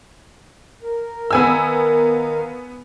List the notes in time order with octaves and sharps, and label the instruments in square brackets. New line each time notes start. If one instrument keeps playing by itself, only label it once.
[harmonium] A#4
[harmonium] D#3 A#4 F5 [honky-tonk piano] B3 G#5 E6